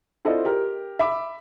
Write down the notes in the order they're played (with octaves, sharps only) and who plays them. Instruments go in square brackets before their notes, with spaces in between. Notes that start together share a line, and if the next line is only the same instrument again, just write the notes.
[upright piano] C4 E4 F4 A4 D5 D#5
G4 A#4
E5 B5 D6